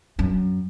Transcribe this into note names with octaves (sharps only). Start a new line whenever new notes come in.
F#2